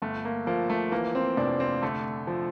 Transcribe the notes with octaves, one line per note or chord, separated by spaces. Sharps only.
G1 A3
A#3
F3 A#3
A3
E3 A#3
C4
F1 D4
C4
D3 A3
F3